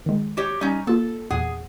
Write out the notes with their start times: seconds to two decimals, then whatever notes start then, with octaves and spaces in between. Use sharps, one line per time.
0.06 D#3 G#3
0.37 F#4 G4 C#5
0.61 G3 C#4 D#4
0.87 A#3 F4 A4
1.31 E2 A#2 G#4 F#5